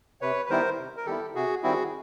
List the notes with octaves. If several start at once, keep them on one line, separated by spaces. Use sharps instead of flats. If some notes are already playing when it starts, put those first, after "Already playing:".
C3 B4 C#5
B4
D#3 G3 B3 E4 A#4 C5
C3
A#4
D#3 G3 B3 E4 G4 A4
C3 F#4 G#4
D#3 G3 C4 E4 F#4 G#4